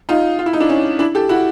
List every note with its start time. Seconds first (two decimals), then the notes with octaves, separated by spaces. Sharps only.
0.09 D#4 F4
0.39 F4
0.46 E4
0.53 D#4
0.60 D4 E4
0.69 C#4 D#4
0.99 D4 E4
1.15 G4 A4
1.29 E4 F#4